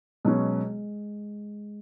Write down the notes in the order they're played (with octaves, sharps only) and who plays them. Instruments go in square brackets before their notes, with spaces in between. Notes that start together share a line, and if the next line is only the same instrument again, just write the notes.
[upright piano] B2 F#3 C#4 [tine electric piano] G#3